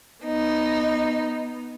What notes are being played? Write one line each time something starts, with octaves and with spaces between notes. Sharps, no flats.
B3 D#4